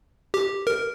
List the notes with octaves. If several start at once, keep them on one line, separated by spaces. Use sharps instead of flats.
G4
A#4